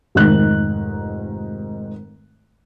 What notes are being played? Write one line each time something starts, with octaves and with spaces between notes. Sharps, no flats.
F1 G#2 D#3 F#6